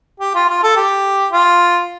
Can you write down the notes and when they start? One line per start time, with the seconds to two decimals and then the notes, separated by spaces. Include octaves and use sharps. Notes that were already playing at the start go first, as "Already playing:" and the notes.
0.20 G4
0.35 F4
0.49 F4
0.63 A4
0.76 G4
1.32 F4